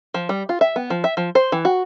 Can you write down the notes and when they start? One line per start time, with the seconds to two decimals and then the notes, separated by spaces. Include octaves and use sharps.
0.14 F3
0.29 G3
0.49 F4
0.61 E5
0.76 B3
0.90 F3
1.04 E5
1.17 F3
1.35 C5
1.52 E3
1.65 F#4